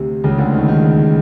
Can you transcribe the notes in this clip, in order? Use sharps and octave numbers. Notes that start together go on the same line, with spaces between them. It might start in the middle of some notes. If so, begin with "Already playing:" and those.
Already playing: D2 C3
C#2 C#3
D2 D3
D#2 D#3
D#3